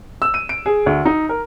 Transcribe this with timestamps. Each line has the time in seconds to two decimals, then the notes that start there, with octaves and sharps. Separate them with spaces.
0.22 E6
0.34 D#7
0.49 D7
0.66 G#4
0.86 D2
1.05 D#4
1.29 A#4